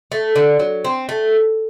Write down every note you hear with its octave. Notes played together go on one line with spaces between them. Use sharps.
A3
D3
F#3
C4
A3